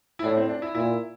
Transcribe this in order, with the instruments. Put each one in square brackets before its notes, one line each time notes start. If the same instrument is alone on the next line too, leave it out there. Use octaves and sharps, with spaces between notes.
[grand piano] E4
[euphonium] A2 [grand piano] D4
[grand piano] C4
D4
E4
[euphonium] A#2 [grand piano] E4